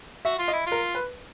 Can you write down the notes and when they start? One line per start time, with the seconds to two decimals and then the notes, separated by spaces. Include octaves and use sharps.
0.25 F#4 E5
0.38 F4
0.48 D#5
0.53 E4
0.66 F4
0.72 A#4
0.95 B4